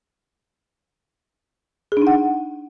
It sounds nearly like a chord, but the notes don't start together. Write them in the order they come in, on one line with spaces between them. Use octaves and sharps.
G#4 D4 D#4 F#5